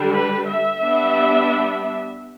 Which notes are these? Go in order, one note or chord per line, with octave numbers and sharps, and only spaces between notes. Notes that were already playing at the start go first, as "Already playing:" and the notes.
Already playing: D3 G3 D4
B4
E5
G3 B3 D4